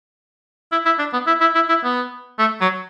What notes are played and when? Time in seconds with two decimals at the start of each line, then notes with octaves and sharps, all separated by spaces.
0.72 E4
0.86 E4
0.99 D4
1.13 B3
1.27 E4
1.41 E4
1.55 E4
1.69 E4
1.84 B3
2.39 A3
2.61 F#3